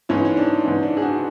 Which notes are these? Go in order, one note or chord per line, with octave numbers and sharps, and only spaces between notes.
G#2 E3 C#4 E4
C#4
D4
G#2 E3
D4
G#4
D4 F#4